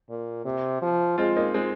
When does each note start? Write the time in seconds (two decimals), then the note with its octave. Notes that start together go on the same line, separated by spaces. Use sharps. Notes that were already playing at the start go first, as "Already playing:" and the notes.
0.09 A#2
0.45 C3
0.82 F3
1.18 G#3 C4 F4
1.36 A#3 D#4
1.54 G#3 C4